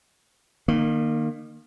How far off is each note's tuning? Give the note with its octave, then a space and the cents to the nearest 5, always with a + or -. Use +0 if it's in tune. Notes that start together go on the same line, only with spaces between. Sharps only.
D#3 -30 A#3 +0